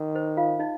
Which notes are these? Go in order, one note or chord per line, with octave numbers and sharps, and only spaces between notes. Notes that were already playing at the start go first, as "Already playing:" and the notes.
Already playing: D#3
C5
F4 F5
D#4 D#5